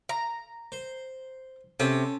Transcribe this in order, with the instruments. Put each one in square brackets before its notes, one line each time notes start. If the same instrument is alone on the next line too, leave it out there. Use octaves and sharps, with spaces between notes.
[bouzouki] A#5
[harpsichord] C5
[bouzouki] C3 [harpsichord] C#4 A4 C#5